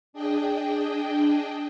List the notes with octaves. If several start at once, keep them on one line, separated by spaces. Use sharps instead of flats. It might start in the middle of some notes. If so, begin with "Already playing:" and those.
D4 G#4 D#5 G5